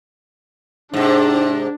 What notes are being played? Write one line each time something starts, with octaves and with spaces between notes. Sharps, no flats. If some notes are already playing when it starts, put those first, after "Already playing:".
G#2 C3 D4